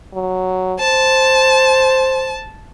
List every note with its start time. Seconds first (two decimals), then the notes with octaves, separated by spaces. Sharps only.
0.14 F#3
0.80 C5 A5